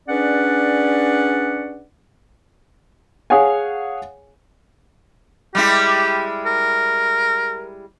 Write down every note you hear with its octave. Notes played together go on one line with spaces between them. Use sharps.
C#4 D4 G#4 B4 D5 F#5
G#4 C#5 F5 F#5 G#5
G3 G#3 E4 G4
A#4